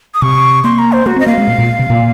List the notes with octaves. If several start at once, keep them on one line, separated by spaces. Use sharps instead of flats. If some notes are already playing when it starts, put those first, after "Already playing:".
D#6
C3 C#6
A#3 C6
A#5
C5
A#3 F#4
C4 D#5
A#3 F5
G#3
A#2
A#2
C3
A#2